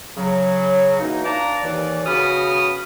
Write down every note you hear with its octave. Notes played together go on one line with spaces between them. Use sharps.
C#3 F#3
B2 E3 A#3 D#4
D4 F4 B4 A5 A#5 D6
D#2 E3 D5
C#3 B3 F#4 B5 D#6 F6